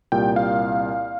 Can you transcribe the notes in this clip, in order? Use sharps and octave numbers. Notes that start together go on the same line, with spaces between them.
C2 A#2 G3 G5
F5